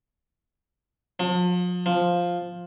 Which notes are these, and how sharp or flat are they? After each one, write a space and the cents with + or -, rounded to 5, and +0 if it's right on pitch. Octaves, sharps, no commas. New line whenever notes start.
F3 +40
F3 +5